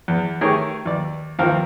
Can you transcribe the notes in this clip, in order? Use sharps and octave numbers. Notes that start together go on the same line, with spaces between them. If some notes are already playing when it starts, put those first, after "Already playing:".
E2
D#3 A3 G4 G#4 A#4 C#5
D#2 D5
D#2 F3 C4 A#4 F5